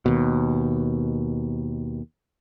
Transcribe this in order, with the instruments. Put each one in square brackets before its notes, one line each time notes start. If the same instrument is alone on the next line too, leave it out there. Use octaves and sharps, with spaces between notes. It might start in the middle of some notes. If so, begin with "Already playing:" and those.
[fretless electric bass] D#2 B2